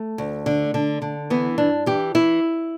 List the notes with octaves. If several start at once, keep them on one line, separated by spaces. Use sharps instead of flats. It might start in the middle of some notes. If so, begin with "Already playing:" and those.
Already playing: A3
D2
D3
D3
D3
E3 B3
G2 D4
E3 G4
E3 E4